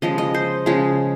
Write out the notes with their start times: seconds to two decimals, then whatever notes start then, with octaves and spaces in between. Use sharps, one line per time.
0.02 C#3 F3 G#3 D#5
0.18 D#5
0.34 C5
0.66 C#3 F3 G#3 G#4